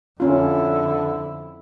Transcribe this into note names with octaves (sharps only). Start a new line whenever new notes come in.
F2 D3 C#4 E4 F4